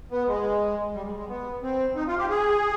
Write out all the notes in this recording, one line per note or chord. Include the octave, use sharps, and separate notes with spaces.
B3
G#3
G3
G#3
G#3
B3
C4
D#4
F4
G4
G#4